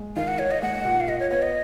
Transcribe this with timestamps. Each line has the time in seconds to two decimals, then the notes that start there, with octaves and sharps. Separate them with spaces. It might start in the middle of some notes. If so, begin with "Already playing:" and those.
Already playing: G#3
0.16 D#3 F5
0.28 F#5
0.39 D#3 C#5
0.51 D#5
0.62 G#3 F#5
0.85 A#2
1.00 F5
1.08 A#2 D#5
1.20 C#5
1.31 B3 C#5
1.42 D#5